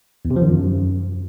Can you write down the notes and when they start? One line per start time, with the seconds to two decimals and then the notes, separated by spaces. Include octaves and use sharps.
0.25 E2
0.31 C3
0.36 F3
0.42 D#3
0.48 F#2